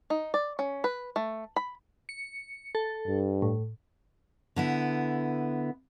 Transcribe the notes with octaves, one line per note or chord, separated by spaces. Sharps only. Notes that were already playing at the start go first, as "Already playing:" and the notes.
D#4
D5
C#4
B4
A3
B5
C#7
A4
G2
A2
D3 B3 E4